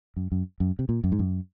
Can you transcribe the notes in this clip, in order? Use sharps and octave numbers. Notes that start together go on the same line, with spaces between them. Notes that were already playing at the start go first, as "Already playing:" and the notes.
F#2
F#2
F#2
C3
A#2
F#2
G#2
F#2